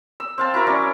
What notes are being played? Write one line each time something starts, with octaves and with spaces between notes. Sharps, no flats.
E6
C4 F5 A5
E4 F#4 A#4
F#3 C#4 D5